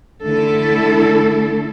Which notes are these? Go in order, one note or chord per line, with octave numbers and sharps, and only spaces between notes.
D3 A3 E4 A4